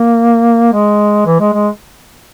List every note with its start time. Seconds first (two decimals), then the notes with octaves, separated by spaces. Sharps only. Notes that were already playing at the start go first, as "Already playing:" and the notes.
Already playing: A#3
0.73 G#3
1.26 E3
1.40 G#3
1.54 G#3